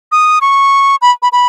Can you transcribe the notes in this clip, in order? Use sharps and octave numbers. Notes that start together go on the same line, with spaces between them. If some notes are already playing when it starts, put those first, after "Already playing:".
D#6
C#6
B5
B5
B5